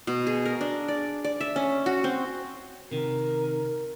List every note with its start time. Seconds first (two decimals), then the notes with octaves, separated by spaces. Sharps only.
0.07 B2
0.27 G#4
0.45 A#4
0.61 D4
0.88 D5
1.24 D5
1.41 E5
1.56 C#4
1.86 F#4
2.04 C4
2.91 C3 D#3 A#4